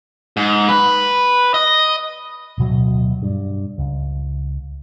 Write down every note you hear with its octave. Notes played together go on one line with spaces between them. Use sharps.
G#2
B4
D#5
D1 B2 F#3
G2
C#2